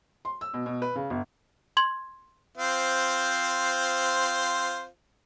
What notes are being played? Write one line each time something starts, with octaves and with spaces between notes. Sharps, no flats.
C6
E6
B2
B2
B4
C#3
G1
C6 G#6 F#7
C4 F4 C5